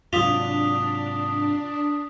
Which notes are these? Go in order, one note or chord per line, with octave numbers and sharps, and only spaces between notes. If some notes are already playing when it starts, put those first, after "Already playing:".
G#2 C3 F#3 D4 F4 D#6 B6 F7